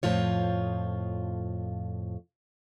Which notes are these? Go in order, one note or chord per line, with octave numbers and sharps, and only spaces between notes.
F2 A2 F3 F4 C#5